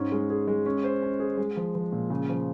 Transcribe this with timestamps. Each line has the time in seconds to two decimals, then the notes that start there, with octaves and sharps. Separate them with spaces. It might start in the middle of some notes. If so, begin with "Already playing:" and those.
Already playing: G#2 C#4
0.12 G#3
0.30 G#4
0.47 G#3
0.66 C#4
0.84 C5
1.02 C#4
1.20 G#4
1.37 G#3
1.57 F3
1.75 F3
1.92 A#2
2.10 C#3
2.29 F3